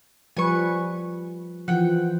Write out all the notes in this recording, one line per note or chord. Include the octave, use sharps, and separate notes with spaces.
F3 G3 B4 G#5 C#6
E3 F3 F#5 G5